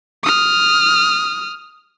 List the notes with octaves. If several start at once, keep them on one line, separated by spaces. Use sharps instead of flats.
D#6 F6